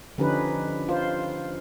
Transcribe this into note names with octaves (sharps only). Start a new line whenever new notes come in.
D3 F3 C#4 D#4 G4 B4
F4 C5